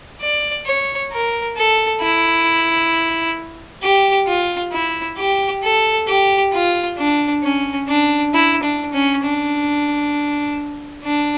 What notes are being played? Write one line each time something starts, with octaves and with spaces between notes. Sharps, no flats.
D5
C#5
A#4
A4
E4
G4
F4
E4
G4
A4
G4
F4
D4
C#4
D4
E4
D4
C#4
D4
D4